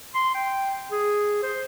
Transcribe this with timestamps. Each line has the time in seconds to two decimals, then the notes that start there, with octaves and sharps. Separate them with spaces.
0.14 C6
0.35 G5
0.92 G#4
1.43 C5